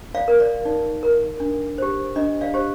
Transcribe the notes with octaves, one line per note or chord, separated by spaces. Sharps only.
D5 F5
A#4
D5
D#4 D5
A#4
D4
G4 C5
D4 D#5
D5 F5
G4 C5